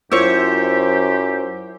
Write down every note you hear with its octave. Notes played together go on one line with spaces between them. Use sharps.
F#2 E4 F4 G4 C5 C#5 E6